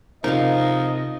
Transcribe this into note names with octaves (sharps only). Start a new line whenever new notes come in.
C3 F3 D#4 A#4 D#5 F5